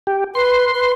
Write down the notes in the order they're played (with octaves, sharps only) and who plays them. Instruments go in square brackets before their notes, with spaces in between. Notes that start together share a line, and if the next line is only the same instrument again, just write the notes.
[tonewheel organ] G4
[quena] B4 [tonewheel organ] C6
[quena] B4